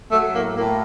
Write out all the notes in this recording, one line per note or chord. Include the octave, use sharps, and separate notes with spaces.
F#3 A3
A2 A#3
A2 A#3